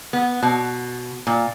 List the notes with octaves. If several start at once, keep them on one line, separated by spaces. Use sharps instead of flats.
B3
B2
A#2